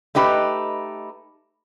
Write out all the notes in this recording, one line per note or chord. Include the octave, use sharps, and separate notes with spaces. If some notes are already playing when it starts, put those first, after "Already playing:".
A3 D#4 G4 B4